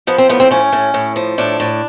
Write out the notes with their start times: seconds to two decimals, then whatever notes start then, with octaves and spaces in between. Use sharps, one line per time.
0.07 F3 B3
0.18 C4
0.29 A2 B3
0.40 C4
0.51 A2 C#4
0.72 A2
0.94 A2
1.16 F3
1.38 A2 D4
1.60 A2